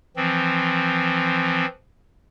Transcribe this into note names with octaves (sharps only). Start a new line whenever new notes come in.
E3 F3 C4